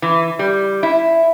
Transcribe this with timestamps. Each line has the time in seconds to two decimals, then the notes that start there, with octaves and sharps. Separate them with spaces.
0.02 E3
0.39 G3
0.83 E4